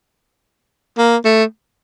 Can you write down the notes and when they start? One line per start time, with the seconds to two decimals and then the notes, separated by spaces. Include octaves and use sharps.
0.98 A#3
1.25 A3